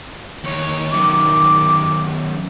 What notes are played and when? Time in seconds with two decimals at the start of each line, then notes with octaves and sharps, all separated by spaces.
0.44 D#2 C#5
0.93 F#2 D#3 D6